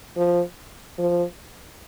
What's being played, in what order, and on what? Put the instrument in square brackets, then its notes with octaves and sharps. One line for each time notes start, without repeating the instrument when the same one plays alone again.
[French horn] F3
F3